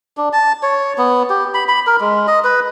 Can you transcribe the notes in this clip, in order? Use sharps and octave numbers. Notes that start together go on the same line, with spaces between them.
D4
A5
C#5
B3
G4
B5
B5
A#4
G#3
D#5
B4